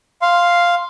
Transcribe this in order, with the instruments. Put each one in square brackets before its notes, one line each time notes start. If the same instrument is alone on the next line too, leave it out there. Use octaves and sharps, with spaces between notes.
[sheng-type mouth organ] F5 C6